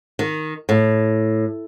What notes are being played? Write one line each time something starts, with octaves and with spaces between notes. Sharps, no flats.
D#3
A2